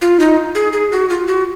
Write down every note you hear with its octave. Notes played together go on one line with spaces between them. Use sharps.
F4
D#4
G#4
G#4
F#4
F4
F#4